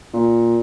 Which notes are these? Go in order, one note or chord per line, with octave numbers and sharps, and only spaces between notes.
A#2